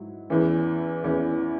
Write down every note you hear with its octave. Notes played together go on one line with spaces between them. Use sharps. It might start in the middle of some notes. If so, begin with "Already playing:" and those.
Already playing: G#2 F#3 E4
E2 E3 C#4
E2 E3 C#4